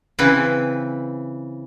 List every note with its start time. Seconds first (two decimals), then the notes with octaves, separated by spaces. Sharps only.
0.19 C#3 E3 C4 E4 B4